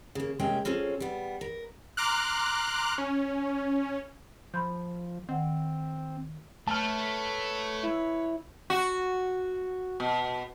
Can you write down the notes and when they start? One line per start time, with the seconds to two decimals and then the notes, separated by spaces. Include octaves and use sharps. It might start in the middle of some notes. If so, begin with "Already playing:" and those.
0.15 C#3 A#3
0.39 C3 G#3 A#3 C#4 G#4 G5
0.65 C4 C#4 F4 G#4 A4
1.00 G3 B3
1.41 A#4
1.97 A#5 C6 D6 F6 F#6
2.98 C#4
4.54 F3 B5 C6 G6
5.29 D#3 C4 F#5
6.68 A3 B4 C#5 A5 F6
7.83 E4
8.70 F#4
10.00 B2